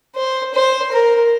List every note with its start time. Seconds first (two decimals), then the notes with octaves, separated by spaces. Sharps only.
0.16 C5
0.54 C5
0.92 A#4